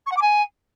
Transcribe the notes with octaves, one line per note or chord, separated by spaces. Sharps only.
C#6
F#5
D6
G#5